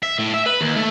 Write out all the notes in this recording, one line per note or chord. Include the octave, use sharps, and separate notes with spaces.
E5
A2
E5
B4
D#2
A3